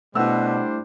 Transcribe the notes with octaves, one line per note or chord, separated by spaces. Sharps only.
B2 G3 A3 D4 E4 C5 F#5 E6